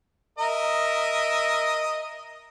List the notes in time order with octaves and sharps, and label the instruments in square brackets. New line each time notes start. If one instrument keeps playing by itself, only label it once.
[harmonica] A#4 D#5 E5